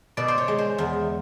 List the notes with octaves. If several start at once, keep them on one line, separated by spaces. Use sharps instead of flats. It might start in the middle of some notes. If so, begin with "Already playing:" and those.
B2 D5
C5
C#5
G#3
C5
E2